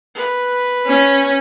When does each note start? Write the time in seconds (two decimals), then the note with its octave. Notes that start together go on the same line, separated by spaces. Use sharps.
0.15 B4
0.86 C#4